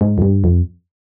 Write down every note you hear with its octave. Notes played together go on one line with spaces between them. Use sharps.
G#2
F2
G2
F2